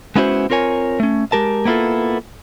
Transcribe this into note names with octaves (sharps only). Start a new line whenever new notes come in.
G#3 B3 C#4 E4 F#4 C5
C4 F4 A#4 C#5 G#5
A3 C#4
G#3 G4 A#4 A5
A#3 B3 E4 F4 A4